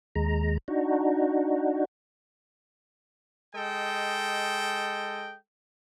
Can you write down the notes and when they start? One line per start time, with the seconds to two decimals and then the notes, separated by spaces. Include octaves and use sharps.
0.15 D#2 G#3 A#5
0.68 D4 D#4 F#4
3.55 G#3 A4 D#5 G5